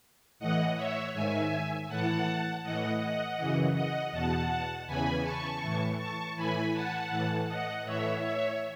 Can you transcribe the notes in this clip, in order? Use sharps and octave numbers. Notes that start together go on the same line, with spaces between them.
A2 E3 D#5 F#5
C#5 E5
G#2 D#3 E5 G#5
A2 E3 F#5 A5
A2 E3 D#5 F#5
D#5 F#5
F#2 C#3 E3
D#5 F#5
E2 B2 F#5 A5
E2 C#3 E3 G#5 B5
A5 C#6
A2 E3
A5 C#6
A2 E3 G#5 B5
F#5 A5
A2 E3
D#5 F#5
A2 E3 C#5 E5
C#5 E5